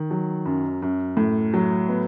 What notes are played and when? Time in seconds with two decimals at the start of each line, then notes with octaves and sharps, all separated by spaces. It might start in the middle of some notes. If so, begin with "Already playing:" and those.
Already playing: D#3
0.11 F#3
0.46 F#2
0.82 F#2
1.17 A2
1.54 F#3
1.89 B3